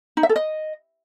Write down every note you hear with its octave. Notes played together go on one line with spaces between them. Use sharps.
D#4
E5
A4
D#5